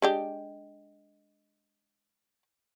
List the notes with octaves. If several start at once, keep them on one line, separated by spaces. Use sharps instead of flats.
G#3 D4 G4